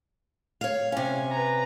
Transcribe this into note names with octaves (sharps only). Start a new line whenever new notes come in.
C#5 F5
C3 C#4 G#5
B4 A#5